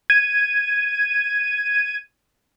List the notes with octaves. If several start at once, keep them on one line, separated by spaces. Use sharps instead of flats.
G#6 D#7